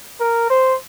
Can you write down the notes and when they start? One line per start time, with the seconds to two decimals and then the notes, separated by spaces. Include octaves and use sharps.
0.20 A#4
0.50 C5